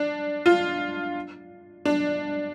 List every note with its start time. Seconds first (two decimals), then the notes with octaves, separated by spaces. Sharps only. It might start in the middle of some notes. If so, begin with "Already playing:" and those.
Already playing: D4
0.46 F4
1.85 D4